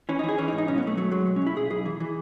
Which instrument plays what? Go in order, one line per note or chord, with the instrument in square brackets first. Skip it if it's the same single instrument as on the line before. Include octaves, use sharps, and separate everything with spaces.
[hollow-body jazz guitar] E3 C#4
E3 D#4
G#4
E3 C#4
D#4
G#2
D#4
B1 C#4
B3
B1 A3
F#3 A3
F#3 G#3
B2
C#4
B2 E4
B1 G#4
B1 G#4
E3
E3